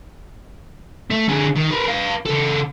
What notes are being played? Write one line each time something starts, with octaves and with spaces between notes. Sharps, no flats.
A3
D3 G#4
D#3
A#4 B4
B4 F5
C#3 A4